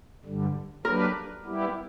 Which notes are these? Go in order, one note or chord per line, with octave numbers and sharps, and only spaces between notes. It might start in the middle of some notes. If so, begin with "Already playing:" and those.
G2 D3 G3
F#3 A#3 D4 G4 A#4 B4
G3 B3 E4 G4